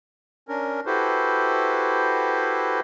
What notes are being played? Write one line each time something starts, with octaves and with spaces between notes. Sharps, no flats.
C#4 D4 A#4
E4 F#4 G4 A4 B4 C5